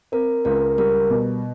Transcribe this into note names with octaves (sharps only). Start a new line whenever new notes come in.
C4 A#4
C#2 A#4
G3 A#4
B2